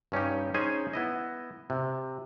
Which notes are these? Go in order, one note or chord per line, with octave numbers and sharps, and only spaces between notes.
G2 C#4 D#4 G4
C#4 D#4 G#4 C5 G#5
B3 E4 D#5
C3